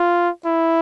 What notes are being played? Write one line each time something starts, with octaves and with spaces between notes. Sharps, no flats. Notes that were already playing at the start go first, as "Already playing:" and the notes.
Already playing: F4
E4